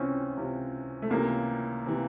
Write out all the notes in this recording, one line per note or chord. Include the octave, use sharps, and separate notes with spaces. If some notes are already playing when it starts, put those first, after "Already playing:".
Already playing: C#2 C3 E3 C4 C#4
C#2 C3 E3
A3
C#2 C3 E3 A#3
C3 E3